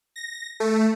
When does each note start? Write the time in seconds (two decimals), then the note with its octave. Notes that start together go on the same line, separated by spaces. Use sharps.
0.16 A#6
0.60 A3